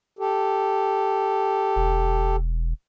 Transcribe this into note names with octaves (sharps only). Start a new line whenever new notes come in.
G4 A4
E1